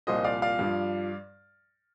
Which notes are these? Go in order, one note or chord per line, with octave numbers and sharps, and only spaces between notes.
C2 A#2 F3 C5 D#5
D5 F5
D5 F5
G2 F3